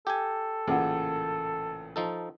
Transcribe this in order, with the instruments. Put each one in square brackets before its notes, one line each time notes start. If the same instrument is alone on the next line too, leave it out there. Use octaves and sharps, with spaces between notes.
[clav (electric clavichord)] G4 G#5 [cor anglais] A4
[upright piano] A1 A#2 C#3 [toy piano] G#4 A#4 F#5
[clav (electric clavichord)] F3 D#4 A4